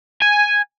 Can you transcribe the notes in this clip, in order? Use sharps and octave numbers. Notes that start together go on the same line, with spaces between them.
G#5